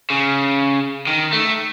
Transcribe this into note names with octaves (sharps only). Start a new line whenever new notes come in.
C#3
D#3
A3